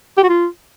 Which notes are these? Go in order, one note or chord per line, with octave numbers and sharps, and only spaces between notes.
G4
F#4
F4